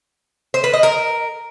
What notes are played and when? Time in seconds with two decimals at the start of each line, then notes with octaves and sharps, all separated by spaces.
0.54 C5
0.64 B4
0.73 D#5
0.83 A#4